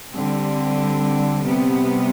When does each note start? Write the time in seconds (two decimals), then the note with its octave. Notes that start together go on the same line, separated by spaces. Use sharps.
0.12 D3 G3 C4
1.45 C3 G3 B3